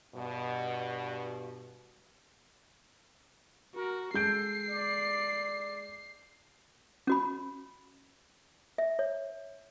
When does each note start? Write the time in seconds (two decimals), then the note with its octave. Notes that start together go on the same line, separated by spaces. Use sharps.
0.15 G2 B2
3.75 F#4 A#4
4.14 G#3 A4 G6 C7 D7
4.70 D5
7.07 C#4 F#4 B5
8.78 E5
8.99 C#5